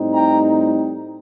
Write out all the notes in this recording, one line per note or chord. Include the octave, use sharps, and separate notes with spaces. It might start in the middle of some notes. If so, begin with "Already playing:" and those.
Already playing: A2 G3 C4 D#4
G5 A#5